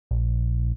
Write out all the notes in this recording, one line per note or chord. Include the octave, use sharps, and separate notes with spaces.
A#1